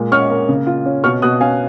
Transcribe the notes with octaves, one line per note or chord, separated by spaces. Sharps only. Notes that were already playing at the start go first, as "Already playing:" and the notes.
Already playing: A#2 G#3
C#4 C#6 F6
A#3
C#3
F4
C#4
B2 C#6 F6
B2 D#6 F#6
C#4 F5 G#5